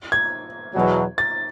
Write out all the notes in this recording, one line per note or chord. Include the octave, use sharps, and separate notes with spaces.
G#6
E2 B2 F#3
A6